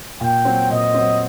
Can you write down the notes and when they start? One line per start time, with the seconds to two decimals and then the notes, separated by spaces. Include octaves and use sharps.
0.21 A#2 G5
0.45 F#3 C4
0.70 A#2 D#5
0.94 F#3 C4